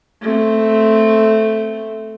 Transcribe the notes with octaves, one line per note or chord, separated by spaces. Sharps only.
A3 C4